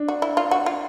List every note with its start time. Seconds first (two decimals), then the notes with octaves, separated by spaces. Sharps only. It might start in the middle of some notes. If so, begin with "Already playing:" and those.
Already playing: D4
0.08 F#4
0.22 E4
0.37 F4
0.51 F#4
0.66 F4